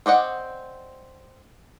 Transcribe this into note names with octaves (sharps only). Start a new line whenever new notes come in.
C4 D5 D#5 F#5